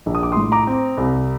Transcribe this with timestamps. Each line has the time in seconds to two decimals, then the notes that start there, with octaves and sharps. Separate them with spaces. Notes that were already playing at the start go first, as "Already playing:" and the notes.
0.06 A#1
0.15 D#6
0.23 D6
0.32 A2 C6 D#6
0.52 A#5 D6
0.67 C4
0.97 C2